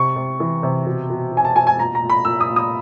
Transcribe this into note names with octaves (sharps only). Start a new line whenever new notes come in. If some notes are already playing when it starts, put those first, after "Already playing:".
Already playing: C3 C#6
C3
E3
C3
B2
B2
B2
G#5
A5
B2 G#5
G#5
A#2 A#5
A#5
A#2
B5
A#2 E6
D#6
A#2
D#6